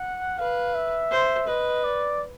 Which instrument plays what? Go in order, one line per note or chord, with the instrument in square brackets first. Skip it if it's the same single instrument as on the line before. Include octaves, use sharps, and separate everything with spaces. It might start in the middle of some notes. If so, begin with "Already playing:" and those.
Already playing: [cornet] F#5
[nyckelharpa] B4 [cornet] F5
[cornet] E5
[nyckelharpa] C5
[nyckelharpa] B4 [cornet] D#5
[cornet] D5